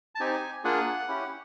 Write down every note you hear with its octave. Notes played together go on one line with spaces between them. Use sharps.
A5
C4 D#4 G4 G#5
A#3 D4 F4 G#4 F#5
C#4 E4 G4